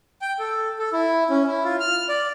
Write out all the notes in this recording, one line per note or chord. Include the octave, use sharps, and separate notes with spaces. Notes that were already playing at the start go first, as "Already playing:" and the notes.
G5
A4
A4
E4
C#4
E4
F4
F6
D5